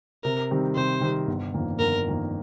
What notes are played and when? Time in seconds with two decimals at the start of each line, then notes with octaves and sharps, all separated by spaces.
0.23 C3 A#4
0.50 D#3 G3 C4 G4
0.75 C3 C5
1.01 D#3 G3 C4 G4
1.27 G1
1.54 F2 D#3 A#3
1.79 G1 A#4
2.06 F2 D#3 A#3